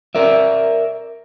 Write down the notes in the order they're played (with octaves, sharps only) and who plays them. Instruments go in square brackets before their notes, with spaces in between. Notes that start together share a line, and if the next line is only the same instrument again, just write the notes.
[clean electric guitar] A#4 D5 E5